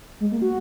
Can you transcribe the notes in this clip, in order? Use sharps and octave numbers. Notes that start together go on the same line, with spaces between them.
G#3
A#3
F#4